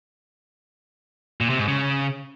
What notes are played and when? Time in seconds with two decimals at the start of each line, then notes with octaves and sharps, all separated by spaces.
1.41 A#2
1.50 C3
1.59 G#2
1.68 C#3